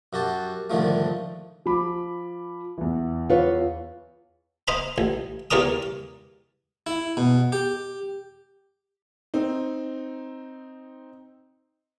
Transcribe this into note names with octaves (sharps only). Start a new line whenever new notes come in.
F#2 F#4 G4 A5
C2 G#2 D3 D#3 F3 A3
F3 B5 D6
E2 E3
F4 B4 C#5
C5 D#5 A#5 B5
A1
E2 G4 A#4 D5 A#5 D#6
E4
B2
G4
C4 D#4